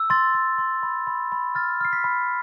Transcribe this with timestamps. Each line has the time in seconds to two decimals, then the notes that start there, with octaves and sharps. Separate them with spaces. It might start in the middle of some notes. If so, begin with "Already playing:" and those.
Already playing: E6
0.10 C6 A6
0.34 C6
0.58 C6
0.83 B5
1.07 B5
1.32 B5
1.55 F6 A6
1.81 F6 C7
1.93 B6
2.04 B5